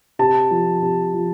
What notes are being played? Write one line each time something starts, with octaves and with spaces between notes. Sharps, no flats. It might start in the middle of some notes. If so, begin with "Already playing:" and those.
C3 A5
F3
C3
F3